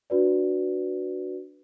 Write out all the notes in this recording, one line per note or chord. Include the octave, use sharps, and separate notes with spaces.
D4 F#4 B4 D5